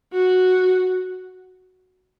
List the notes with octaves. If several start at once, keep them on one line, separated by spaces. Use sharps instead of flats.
F#4